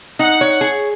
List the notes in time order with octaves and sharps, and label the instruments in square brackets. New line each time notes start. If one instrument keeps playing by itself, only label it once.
[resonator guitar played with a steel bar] D#4 [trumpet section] F#5
[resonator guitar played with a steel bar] C#5
[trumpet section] F#5
[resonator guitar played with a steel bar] G#4